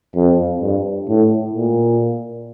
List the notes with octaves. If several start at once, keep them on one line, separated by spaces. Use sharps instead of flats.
F2
G2
A2
A#2